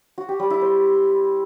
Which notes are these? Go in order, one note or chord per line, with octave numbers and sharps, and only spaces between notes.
F#4
G4
G3
E4
C5